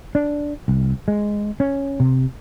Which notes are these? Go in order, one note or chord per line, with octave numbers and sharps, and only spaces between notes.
D4
C2
G#3
C#4
C3